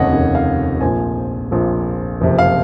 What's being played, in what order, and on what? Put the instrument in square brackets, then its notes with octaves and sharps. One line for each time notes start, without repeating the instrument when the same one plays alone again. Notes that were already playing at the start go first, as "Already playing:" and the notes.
Already playing: [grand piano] F1 D#2 C#3 C#5 D#5 F#5
F1 D#2 C#3
F5
A#1 A#2 F3 G#5
A#1 A#2 F3
F#1 F2 C3 F3
F5